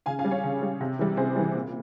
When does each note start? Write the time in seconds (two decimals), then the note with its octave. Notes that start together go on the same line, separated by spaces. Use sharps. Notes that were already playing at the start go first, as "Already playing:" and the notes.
0.06 C#3 F5 G#5
0.19 F5 G#5
0.24 G3
0.31 C#5 F5
0.44 C#3
0.62 G3
0.81 C3
0.99 E3 G3
1.17 C3 G#4 C5
1.36 E3 G3
1.55 A#2